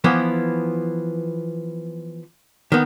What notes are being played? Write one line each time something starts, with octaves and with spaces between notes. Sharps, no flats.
E3 F3 B3
D#3 B3